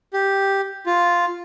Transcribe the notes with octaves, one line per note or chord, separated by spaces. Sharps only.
G4
F4